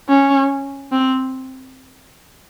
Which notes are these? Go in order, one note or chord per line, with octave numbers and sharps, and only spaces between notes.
C#4
C4